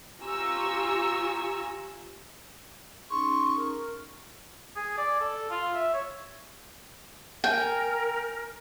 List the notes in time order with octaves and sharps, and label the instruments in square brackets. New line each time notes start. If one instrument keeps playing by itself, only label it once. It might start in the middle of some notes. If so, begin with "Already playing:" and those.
[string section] F4 G4 G#5 A#5 C#6 E6
[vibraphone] C#4 D#4 G#4 [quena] C6 [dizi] C#6
[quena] A#4
[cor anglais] G#4
D5
A4
F4
E5
C#5
[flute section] A#4 [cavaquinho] G5 [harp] G#5